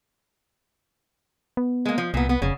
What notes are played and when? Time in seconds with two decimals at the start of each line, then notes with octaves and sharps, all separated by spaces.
1.57 B3
1.85 G#3 A#3
1.98 F3
2.14 C2 A#2 B3
2.29 B3
2.42 F1 C#3